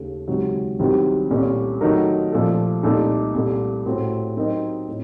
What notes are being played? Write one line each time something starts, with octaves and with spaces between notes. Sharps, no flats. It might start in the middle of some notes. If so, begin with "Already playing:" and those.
Already playing: D#2 C#3 A3
C#2 C3 D#3 F#3
C2 C3 D#3 F#3 C4
C2 A#2 A3 C#4
D#3 F#3 A3 D#4 A#4
A#2 F3 A3
C2 A#2 A3 D#4 A4
C2 A#2 A3
A2 A3 C4 F#4
F#3 C4 D#4 A#4 D#5
A2